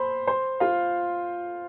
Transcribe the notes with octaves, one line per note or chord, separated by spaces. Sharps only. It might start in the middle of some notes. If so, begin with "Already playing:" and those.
Already playing: C5 B5 C6
C5 C6
F4 F5